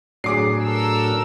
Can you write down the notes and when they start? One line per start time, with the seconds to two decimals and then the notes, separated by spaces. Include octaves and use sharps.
0.24 A2 F#3 D4 G#4 D6 C7
0.63 A4 A#4 E6